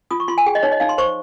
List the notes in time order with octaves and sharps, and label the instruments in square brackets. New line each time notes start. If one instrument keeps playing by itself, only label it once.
[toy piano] F4 D#6
C#6
F4 C6
G#5
G#4 G5
D#5
D#4 C#5
D#5
D#4 F5
C6
C5 C#6